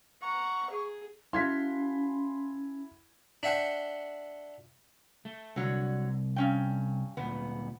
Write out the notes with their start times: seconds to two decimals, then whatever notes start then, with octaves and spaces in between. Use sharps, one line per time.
0.22 F#5 A#5 C#6
0.71 G#4
1.33 C#4 E4 F#4 A4 F5 C6 G#6 B6
3.43 D4 E5 F#5 G5 C#6
5.25 A3
5.56 C2 D3 F#3
6.36 G2 C#4 G5
7.17 D2 A#2 B3